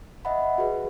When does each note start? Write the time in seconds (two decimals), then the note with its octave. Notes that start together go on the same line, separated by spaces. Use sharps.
0.25 D#5 E5 F#5 B5
0.58 F#4 G#4 B4